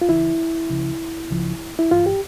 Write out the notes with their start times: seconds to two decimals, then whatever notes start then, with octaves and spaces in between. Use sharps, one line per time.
0.01 F4
0.09 C#2 C#3 E3 E4
0.69 C#2 C#3 F3
1.31 C#2 C#3 F3
1.79 E4
1.91 G2 E3 F4
2.06 G4